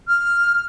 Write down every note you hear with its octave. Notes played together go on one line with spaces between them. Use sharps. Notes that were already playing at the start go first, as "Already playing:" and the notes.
F6